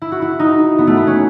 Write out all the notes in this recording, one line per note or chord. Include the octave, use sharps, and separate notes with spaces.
E4
F#4
E4
D#4
B3
A3
B3
C#4